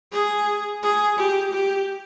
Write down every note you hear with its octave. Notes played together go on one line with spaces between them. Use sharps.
G#4
G#4
G4
G4